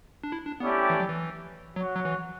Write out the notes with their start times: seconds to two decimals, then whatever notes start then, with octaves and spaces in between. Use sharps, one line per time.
0.24 D4
0.32 E4
0.47 D4
0.60 A3 B3 C#4 E4 G4 D5
0.90 E3
1.00 F#3
1.09 E3
1.76 F#3 F#4 C#5 F#5
1.95 F#3
2.05 E3